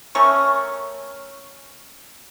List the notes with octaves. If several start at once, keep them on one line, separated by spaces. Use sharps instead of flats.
A3 C#4 A#4 C#6